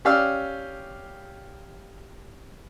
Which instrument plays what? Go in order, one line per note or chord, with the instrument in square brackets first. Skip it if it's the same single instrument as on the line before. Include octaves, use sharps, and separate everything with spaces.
[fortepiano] C#4 G4 D5 F5 E6 F6